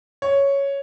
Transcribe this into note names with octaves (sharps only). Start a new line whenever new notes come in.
C#5